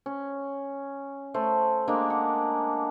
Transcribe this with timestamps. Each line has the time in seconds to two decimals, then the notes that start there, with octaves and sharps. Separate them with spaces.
0.06 C#4
1.34 A3 C5
1.88 G#3 A#3 D4
2.10 F#5